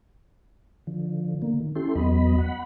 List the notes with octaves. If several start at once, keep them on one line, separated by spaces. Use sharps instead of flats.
D3 F3
D3 A#3
D#3
C#4 E4 G4 A4 C6
E2 F#3 B3 D#5 B5
F#5 B5